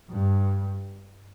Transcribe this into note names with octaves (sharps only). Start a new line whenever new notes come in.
G2